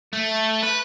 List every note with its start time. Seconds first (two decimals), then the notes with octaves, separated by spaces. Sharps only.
0.13 A3
0.63 B4